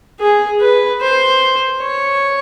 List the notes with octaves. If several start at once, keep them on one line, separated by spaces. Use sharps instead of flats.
G#4
B4
C5
C#5